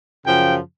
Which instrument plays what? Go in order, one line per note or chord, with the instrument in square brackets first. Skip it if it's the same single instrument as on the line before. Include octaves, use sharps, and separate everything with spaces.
[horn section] F#2 C#3 F3 G5